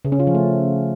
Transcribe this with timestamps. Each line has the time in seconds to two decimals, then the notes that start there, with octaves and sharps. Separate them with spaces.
0.05 C#3
0.12 C#4
0.20 F4
0.27 F3
0.35 A3